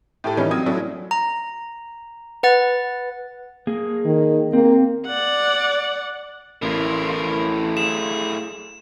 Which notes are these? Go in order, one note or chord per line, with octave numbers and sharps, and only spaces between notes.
A2 G4 A4
D#3 E3 G3 C#4 D#4
F#3 C4 F4 D#6 G#6
F#3 A3 C#4 D4 E4
A#5
B4 F#5 A6
A#3 G#4
D#3
A#3 C4
D5 F#5
A1 A2 F4 A#4
G#4 E7